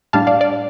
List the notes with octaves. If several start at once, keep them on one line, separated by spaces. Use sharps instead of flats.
A2 G3 D4 F5 A5
D5 F5
D5